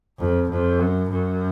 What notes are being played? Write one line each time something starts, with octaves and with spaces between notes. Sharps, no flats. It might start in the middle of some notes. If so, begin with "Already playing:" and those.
F2
F2
F#2
F#2